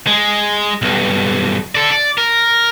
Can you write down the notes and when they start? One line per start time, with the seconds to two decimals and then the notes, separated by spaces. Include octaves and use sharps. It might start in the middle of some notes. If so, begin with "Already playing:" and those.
0.07 G#3
0.82 B1 G2
1.75 A4 D5
1.90 D5
2.18 A#4